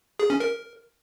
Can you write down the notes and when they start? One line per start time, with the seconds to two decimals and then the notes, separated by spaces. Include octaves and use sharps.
0.19 G#4
0.30 C#4
0.40 A#4